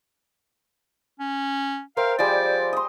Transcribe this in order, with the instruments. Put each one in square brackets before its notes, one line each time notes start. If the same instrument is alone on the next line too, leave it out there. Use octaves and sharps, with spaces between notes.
[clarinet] C#4
[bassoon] A#4 [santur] C5 E5 G5 [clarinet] F5
[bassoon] F3 [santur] G3 G#3 G5 [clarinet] D5
[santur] D#5 C6